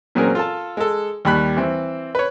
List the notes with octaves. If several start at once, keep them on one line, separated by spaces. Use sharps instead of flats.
A#2 F#3 C4 C#4 G#4 A#4
F4 A4 A5
G#3 A4
D#2 G3 B5 F#6
E3 C4
B4 C#5